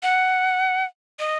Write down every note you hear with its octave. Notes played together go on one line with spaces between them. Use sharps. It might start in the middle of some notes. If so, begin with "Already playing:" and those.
F#5
D#5